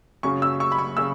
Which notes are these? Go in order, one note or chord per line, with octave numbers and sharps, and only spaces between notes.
F#2 C#3 F#3 C#4 C#6
E6
C#6
B5
C#6
C#3 E6